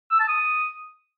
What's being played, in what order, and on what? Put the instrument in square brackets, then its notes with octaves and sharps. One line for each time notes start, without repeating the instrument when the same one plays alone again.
[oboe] E6
A5
D#6